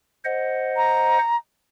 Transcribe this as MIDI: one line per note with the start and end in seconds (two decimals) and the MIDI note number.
0.25 1.18 72
0.25 1.18 75
0.25 1.18 78
0.76 1.36 82